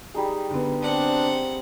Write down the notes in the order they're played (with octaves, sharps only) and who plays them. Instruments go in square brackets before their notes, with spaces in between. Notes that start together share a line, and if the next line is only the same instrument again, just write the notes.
[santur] G3 D#4 G#4
[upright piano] D3 B3
[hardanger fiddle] C4 F#5 [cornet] D4